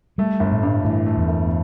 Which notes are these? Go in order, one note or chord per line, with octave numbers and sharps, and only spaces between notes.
G3 A3
G1
A2
G2
A2 E3
A3
E2
G1